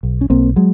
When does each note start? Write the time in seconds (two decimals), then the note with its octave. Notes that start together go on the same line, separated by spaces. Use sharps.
0.03 B1
0.21 C#4
0.30 B1 A#3 C4
0.56 F#3 G#3